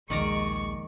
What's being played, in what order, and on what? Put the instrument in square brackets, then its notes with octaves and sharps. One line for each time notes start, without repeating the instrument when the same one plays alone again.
[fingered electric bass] A#1 D#2 [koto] D#3 D5 A#5 [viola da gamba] G#3 [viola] C#6